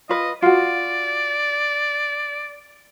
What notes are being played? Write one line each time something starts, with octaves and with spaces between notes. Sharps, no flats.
F4 B4 D#5
F4 F#4 D5